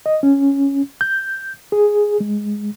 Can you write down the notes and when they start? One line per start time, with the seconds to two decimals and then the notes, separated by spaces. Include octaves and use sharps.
0.06 D#5
0.23 C#4
1.01 G6
1.72 G#4
2.20 G#3